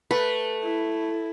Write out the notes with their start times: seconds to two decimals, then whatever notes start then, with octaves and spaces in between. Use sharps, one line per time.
0.11 A3 B4
0.64 E4